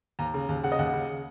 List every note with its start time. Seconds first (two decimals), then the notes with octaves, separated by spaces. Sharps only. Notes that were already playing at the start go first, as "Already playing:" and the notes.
0.19 D#2 A#5
0.34 C#3
0.49 D#2
0.64 C#3 F#5
0.72 D#5
0.79 D#2 F#5
0.93 C#3